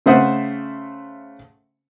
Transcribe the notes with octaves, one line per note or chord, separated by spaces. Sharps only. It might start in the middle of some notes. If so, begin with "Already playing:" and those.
C#3 A3 C5 E5 F#5 D#6